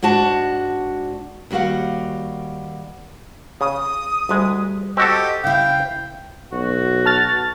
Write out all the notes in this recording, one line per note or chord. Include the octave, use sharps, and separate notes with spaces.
G#2 D4 F#4 A5
D#2 G3 F#4 F5 F#5
C#3 D#6
D2 G3 G#3
C4 F#4 G4 A4 D#5
C#3 E4 F5 G5
B1 F#4
A5 F6 A6